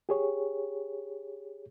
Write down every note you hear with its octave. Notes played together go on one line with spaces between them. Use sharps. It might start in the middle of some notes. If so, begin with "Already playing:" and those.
G4 G#4 C#5